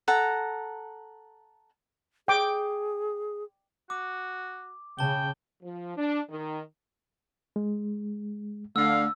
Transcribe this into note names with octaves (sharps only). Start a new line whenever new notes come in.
A4 F#5 A#5
G#4 G5 D6
F#4 D6
C#3 G5 A5 G7
F3
D4
D#3
G#3
D3 A3 F5 E6